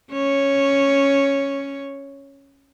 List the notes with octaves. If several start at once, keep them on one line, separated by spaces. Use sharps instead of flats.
C#4 C#5